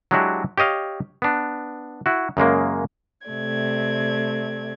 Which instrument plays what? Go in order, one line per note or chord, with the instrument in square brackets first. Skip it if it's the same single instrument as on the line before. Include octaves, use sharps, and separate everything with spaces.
[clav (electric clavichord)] F#3 G#3 D4 E4 F#4 G4
G4 C#5 D#5 F5
B3 D4
E4 F#4
F#2 C#3 G#3 A#3
[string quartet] C3 A3 D5 G#6